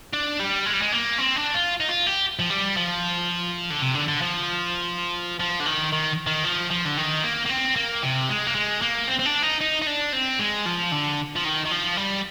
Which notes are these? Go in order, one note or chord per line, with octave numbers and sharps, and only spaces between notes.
D4
G3
G#3
G3
G#3
A#3
C4
D4
F4
D#4
F4
G4
F3
G3
F3
D3
C3
D3
D3
F3
F3
D3
D#3
D#3
D#3
F3
F3
D3
D#3
A#3
A#3
C4
A#3
C3
G#3
A#3
G#3
A#3
C4
C4
D4
D#4
D#4
D#4
D4
C4
G#3
F3
D3
F3
D#3
D#3
F3
G3